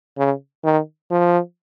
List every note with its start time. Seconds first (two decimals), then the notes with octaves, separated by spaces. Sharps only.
0.18 C#3
0.64 D#3
1.11 F3